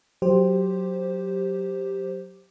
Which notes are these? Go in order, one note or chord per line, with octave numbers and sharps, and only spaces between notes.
F#3 G4 C5